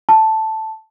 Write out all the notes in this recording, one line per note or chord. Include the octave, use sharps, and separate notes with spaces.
A5